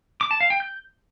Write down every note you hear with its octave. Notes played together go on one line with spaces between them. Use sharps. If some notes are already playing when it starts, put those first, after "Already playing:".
D6
A5
F5
G5
G6